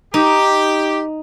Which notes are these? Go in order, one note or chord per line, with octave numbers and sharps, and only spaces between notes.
D#4 G4